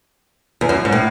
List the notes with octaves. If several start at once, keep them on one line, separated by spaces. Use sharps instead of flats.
E2
F#2
G#2
A2